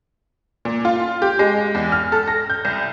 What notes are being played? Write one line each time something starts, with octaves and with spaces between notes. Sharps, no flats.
A#2
F4
G4
G#3
E2
F6
A4
A#6
G6
C2